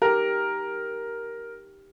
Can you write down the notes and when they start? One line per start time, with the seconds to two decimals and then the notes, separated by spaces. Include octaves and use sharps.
0.02 D#4 G4 A#4